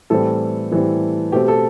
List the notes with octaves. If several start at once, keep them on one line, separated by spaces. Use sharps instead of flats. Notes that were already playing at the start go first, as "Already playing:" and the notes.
A2 E3 G3 C4 A4
A2 E3 G3 C4
B2 A3 C4 G4
A4